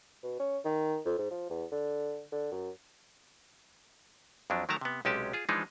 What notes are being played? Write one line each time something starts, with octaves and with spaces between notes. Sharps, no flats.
B2
C#4
D#3
F2
G#2
F3
E2
D3
D3
F#2
F2 F3 F#3 D4
D#3 F#3 A3 A#4 A5 A#5
C3 B3
B1 C3 G#3 C#4 G4 A5
F4 G#4
E3 F3 G#3 D4 D#4 F4